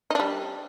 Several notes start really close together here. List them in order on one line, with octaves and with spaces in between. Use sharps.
D#4 D4 G3